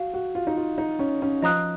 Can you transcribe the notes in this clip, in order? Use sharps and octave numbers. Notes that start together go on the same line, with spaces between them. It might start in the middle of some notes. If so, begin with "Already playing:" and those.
Already playing: F#4 F5
F#4
F4
D#4
F4
D#4
C#4
C#4
F3 D#5 A#5 D#6 F#6